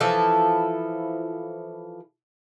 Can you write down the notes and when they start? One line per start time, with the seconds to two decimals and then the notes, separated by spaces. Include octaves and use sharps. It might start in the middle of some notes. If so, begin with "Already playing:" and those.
0.01 E3 F3 E4 A4